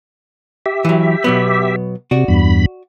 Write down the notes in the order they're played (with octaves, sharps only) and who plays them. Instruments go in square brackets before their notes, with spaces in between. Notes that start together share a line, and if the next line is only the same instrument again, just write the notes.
[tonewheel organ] G4 E5
[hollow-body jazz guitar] E3 F#3
B2 F#3 B3
[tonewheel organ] C3 [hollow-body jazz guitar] F#4 D5
[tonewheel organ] E2 G2 B5